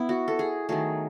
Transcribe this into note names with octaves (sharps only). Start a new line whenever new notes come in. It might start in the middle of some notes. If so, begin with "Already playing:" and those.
Already playing: B3 E4
F#4
A4
G#4
D#3 F#3 A3 G#4